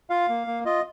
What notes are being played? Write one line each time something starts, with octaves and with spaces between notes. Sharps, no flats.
F4 F5
A#3
A#3
F4 D#5